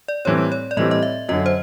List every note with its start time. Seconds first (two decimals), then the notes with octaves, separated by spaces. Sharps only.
0.08 D5
0.25 A2 E3 G3 C4 C#5
0.52 C#5
0.71 D5
0.77 A2 E3 G3 C4 D#5
0.91 D#5
1.03 E5
1.29 F#2 D3 F#3 D#5
1.46 C5